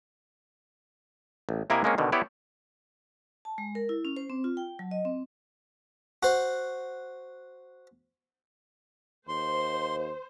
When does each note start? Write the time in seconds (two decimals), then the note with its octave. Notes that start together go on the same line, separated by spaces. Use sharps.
1.49 A1
1.70 C3 A#3 E4 A#4 D#5 G#5
1.84 G#3 A#3 C4 C#4
1.98 B2 D3 D#3
2.12 B3 E4 G4 C#5 D5
3.45 A5
3.58 G#3
3.75 A#4
3.89 E4
4.05 C#4
4.17 C5
4.30 C4
4.44 F4
4.57 G5
4.79 F#3
4.91 D#5
5.05 C4
6.23 F#4 C5
9.28 D#2 C5 C6